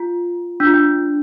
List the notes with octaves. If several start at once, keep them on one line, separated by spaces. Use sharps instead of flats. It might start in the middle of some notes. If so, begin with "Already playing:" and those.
Already playing: F4
D4
F4
D4